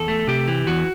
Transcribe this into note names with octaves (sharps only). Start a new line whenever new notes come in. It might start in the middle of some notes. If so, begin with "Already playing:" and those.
Already playing: E2 A4
A3
C3 G4
E3
E2 F#4